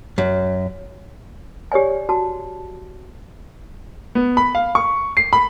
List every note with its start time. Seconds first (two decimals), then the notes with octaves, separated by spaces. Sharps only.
0.18 F#2
1.72 G4 C#5 D5 G#5
2.09 F#4 A5
4.15 B3
4.37 B5
4.55 F5
4.75 C#6
5.17 C7
5.33 B5